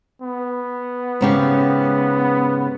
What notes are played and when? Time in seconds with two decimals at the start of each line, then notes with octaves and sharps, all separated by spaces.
0.22 B3
1.21 G#2 C#3 G4